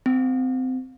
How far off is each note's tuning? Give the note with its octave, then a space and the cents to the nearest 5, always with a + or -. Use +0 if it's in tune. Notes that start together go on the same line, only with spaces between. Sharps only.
C4 -25